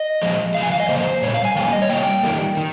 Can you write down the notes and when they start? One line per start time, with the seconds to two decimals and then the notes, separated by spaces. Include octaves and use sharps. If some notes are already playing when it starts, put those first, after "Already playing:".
Already playing: D#5
0.22 A#2 F3 G#3
0.55 C3 F3 F5
0.63 G#5
0.72 F5
0.80 D#5
0.89 C#3 F3 A#3 C5
1.22 A#2 G3 C#5
1.34 F5
1.45 G#5
1.56 D#3 G3 A#3 G5
1.73 D#5
1.82 C#5
1.90 C3 G3 A#3 G5
2.23 D#3 G3 A#3
2.57 D#3